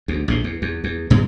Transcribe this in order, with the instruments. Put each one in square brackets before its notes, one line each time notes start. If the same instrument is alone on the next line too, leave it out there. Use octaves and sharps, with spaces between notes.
[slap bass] D2
A#1 D#2 A2
E2
E2
E2
G2 B2 E3 G#3